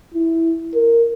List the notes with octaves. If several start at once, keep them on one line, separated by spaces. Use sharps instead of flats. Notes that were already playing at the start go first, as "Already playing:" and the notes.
E4
A#4